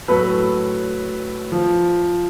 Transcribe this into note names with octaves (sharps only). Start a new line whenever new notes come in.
A2 F#3 A4 B4
F3